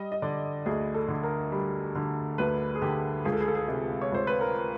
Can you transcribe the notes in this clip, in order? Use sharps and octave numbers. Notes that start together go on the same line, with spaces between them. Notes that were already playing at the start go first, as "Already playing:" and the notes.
Already playing: G3 D#5
D#5
D3 D5
D2 G#4
A4
D3
A#4
G3
D3
D2 B4
G#4
D3 G4
C#2 G#4
A4
G#4
A4
G#4
C3 G#4
C#5
C#2 C5
B4
A#4